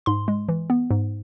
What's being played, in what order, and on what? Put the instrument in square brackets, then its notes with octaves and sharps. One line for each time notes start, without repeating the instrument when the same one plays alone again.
[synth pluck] G#2 C6
G#3
E3
B3
G#2